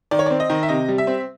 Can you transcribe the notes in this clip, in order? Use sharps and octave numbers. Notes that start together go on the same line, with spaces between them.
D#3 D5
C#5
C4 D5
D#5
D#3
E5
C3 D#5
G3
E5
C4